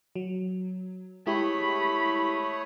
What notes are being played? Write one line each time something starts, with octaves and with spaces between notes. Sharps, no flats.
F#3
G#3 A3 E4 G4 C#5 B5 D#6